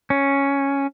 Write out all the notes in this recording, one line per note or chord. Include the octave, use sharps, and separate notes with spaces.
C#4